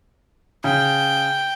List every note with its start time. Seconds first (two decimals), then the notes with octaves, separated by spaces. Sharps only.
0.64 C#3 G5